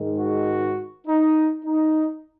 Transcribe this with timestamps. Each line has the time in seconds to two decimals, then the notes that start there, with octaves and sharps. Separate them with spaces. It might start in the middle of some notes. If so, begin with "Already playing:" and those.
Already playing: G#2 D#3 G#3
0.19 F#4
1.07 D#4
1.65 D#4